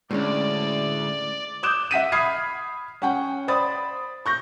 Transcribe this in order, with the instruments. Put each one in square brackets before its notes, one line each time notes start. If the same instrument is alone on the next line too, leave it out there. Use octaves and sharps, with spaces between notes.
[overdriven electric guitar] D2 [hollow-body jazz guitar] A2 G#3 C#4 [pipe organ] D5
[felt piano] D6 D#6 F#6 G6 E7
E5 F#5 B6 D#7
B5 D#6 F6 G#6 C7
C#4 F#5 G5
C5 D5 B5 D#6 A6
C#6 G6 A#6